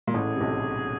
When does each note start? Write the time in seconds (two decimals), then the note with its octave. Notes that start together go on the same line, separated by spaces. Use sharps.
0.07 A#2
0.14 A1 A2 G#4
0.36 C3
0.40 B1 B2